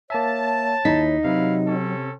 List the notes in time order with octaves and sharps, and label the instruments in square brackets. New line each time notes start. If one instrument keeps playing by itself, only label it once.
[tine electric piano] A#3 E5 [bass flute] C#5 [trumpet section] A5
[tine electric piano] D#2 E4 B6 [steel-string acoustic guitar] D#4
[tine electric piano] C3 [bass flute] F#3 [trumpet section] E4 B4 F5
[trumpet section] C4 C#4 A4